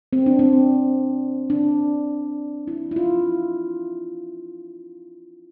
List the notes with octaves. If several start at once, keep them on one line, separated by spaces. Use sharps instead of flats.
C4
D4
C4
D4
E4
E4
F4